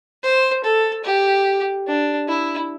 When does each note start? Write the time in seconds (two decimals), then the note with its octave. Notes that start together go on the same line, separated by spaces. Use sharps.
0.23 C5
0.64 A4
1.04 G4
1.87 D4
2.28 E4